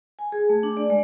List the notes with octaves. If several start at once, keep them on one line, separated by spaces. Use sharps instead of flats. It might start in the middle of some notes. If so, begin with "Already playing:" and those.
G#5
G#4
A3
D4
D5
G#3